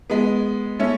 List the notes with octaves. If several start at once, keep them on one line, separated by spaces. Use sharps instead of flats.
G#3 B3
A3 C#4